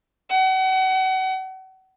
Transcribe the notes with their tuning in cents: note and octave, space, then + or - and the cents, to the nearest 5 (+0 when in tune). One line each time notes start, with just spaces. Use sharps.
F#5 +35